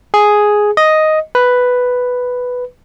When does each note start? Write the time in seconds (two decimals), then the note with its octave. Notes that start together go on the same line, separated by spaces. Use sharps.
0.14 G#4
0.77 D#5
1.35 B4